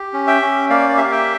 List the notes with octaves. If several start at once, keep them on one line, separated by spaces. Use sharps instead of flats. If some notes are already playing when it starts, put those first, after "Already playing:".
Already playing: G4
C#4
E5 G5
C#4
A#3 D5 F5
D5
G4 E5
F5
E5 G5